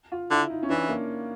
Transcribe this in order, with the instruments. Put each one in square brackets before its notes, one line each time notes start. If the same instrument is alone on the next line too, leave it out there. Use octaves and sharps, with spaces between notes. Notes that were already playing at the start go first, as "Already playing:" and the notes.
[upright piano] F4
[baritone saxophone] D3 [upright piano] E4
[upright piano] D#4
C#4
[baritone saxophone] E3 [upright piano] D4
[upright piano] A#3